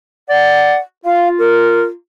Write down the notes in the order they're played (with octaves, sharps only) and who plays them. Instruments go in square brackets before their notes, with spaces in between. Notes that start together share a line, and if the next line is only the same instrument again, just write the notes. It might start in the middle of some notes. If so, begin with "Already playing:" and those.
[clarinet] D5 [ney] F#5
[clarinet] F4 [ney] F5
[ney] A#4